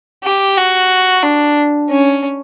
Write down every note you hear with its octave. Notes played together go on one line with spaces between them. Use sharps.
G4
F#4
D4
C#4